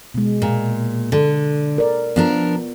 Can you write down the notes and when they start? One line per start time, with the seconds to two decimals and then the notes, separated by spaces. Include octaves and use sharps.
0.14 B2 G#3
0.42 A#2
1.12 D3
1.78 A#4 D5
2.16 F3 B3 D4 F4 A#4